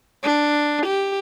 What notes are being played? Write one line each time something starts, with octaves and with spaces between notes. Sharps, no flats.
D4
G4